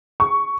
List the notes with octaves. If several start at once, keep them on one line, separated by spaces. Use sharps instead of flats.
C#6